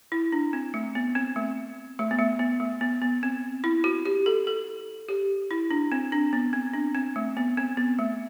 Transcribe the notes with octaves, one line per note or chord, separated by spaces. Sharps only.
E4
D4
C4
A3
B3
C4
A3
A3
B3
A3
B3
A3
B3
B3
C4
E4
F#4
G4
A4
A4
G4
E4
D4
C4
D4
B3
C4
D4
C4
A3
B3
C4
B3
A3